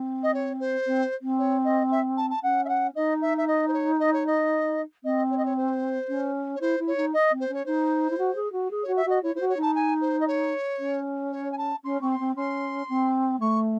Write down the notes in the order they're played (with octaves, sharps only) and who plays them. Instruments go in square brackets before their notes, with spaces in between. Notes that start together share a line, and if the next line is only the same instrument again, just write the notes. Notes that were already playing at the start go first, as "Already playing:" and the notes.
Already playing: [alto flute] C4
[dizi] D#5
C#5
C5
[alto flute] C4
C4
[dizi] C#5
D#5
E5
A5
A5
[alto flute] C#4 [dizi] F#5
[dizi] E5
F#5
[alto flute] D#4 [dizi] D#5
[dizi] E5
E5
D#5
C5
C#5
D#5
C#5
D#5
[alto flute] C4 [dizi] D#5
[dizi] C#5
D#5
C#5
C5
[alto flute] C#4
[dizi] C#5
[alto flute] E4 [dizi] C5
[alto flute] E4
[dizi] C#5
[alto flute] D#4
[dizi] D#5
[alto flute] C4
[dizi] C5
[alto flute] C#4 [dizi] C#5
[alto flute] D#4 [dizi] C5
[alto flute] E4
F#4
G#4
F#4
G#4
[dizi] C#5
[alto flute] F#4
[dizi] E5
[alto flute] F#4 [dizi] D#5
[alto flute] E4 [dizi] C#5
[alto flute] E4 [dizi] C5
[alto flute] F#4
[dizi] C#5
[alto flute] D#4
[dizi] A5
G#5
C5
D#5
C#5
[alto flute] C#4
[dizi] C#5
G#5
A5
[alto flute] C#4 [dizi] C6
[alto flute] C4 [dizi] C#6
[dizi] C6
[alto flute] C4
[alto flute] C#4 [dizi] C6
[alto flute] C4
[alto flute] A3 [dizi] C#6